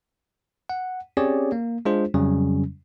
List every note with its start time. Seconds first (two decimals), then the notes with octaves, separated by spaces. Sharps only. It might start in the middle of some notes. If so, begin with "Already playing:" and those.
0.69 F#5
1.17 C4 C#4 G4 G#4 C#5 D5
1.52 A#3
1.85 G#3 D4 F4 G#4 C5
2.14 F2 C#3 F#3 G3 C#4